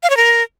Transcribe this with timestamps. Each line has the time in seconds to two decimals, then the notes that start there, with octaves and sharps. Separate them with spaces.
0.03 F5
0.10 C#5
0.17 A#4